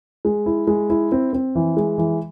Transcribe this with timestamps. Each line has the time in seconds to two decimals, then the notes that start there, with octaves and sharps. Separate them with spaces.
0.25 G#3
0.46 E4
0.67 G#3
0.90 E4
1.12 C4
1.33 C4
1.55 E3
1.77 G#3
1.98 E3